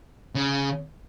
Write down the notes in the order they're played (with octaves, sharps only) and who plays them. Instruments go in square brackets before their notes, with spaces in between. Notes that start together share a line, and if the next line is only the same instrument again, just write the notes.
[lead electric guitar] C#3